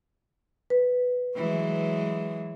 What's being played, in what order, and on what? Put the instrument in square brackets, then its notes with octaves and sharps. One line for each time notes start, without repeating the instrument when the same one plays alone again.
[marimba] B4
[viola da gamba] E3 F#3 G#3